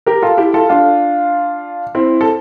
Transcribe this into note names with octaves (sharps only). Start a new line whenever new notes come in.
G4 A#4
F4 A4
E4 G4
F4 A4
D4 F4
C4 E4
A4